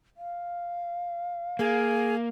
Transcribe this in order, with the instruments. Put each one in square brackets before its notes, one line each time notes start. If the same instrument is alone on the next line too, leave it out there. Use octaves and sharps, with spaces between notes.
[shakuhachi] F5
[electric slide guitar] A#3 [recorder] G#4